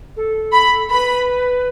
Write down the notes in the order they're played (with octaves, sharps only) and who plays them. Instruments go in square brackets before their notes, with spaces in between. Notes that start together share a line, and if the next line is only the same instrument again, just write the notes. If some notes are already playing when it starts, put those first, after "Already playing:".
[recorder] A4
[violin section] B5
[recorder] B4 [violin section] B5